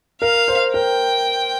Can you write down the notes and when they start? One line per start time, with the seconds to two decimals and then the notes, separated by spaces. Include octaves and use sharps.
0.21 A#4 F5
0.48 C5
0.74 A#4 G5